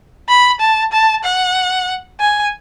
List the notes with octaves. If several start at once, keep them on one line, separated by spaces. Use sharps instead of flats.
B5
A5
A5
F#5
G#5